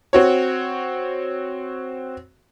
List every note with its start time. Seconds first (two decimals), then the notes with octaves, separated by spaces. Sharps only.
0.13 C4 F#4 C#5